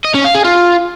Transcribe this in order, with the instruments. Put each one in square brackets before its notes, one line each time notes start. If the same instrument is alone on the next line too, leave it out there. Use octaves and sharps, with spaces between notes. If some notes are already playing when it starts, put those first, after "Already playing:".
[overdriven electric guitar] D#5
C#4
F5
G#4
F4